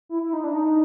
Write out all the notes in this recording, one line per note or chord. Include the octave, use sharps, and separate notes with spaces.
E4
E4
D#4
D4
D#4